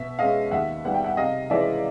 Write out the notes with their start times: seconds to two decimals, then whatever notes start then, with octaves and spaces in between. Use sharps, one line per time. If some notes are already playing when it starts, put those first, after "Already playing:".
Already playing: B2 E5
0.19 G#3 C#4 D#5 F5
0.51 D#2 E5 F#5
0.84 D#3 G3 B3 F#5
0.94 G5
1.04 E5 F#5
1.17 C3 D#5 F5
1.50 E3 G#3 C#4 D5 E5